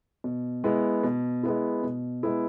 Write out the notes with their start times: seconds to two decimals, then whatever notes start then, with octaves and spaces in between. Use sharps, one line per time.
0.24 B2
0.64 G#3 B3 E4
1.03 B2
1.43 G#3 B3 E4
1.83 B2
2.23 G#3 B3 E4